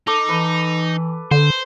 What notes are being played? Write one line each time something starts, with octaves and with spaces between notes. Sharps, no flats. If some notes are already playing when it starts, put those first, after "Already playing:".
D#4 A4 D6
E3 B4
D3 C5